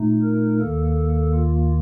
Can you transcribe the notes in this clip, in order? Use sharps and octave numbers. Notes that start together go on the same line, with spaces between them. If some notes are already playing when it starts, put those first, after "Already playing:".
Already playing: A#2 A3 D#4
A#4
D#2 D#3 A#3 A4
F4